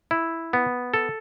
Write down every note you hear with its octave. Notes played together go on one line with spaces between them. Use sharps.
E4
B3
A4